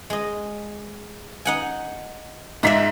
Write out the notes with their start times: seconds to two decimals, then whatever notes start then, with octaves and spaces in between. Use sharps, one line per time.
0.10 G#3 D#5
1.45 D#4 F#5 G#5
2.63 G#2 F4 D5 E5 B6